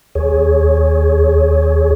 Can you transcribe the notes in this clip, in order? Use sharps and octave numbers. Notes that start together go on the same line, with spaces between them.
D#2 G#4 C#5